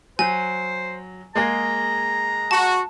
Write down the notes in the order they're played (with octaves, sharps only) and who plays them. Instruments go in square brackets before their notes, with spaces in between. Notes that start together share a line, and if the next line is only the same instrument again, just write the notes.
[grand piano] F#3 [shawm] C5 [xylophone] G#5
[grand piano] G#3 A#3 G#4 [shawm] A#5
[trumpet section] F#4 [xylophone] A5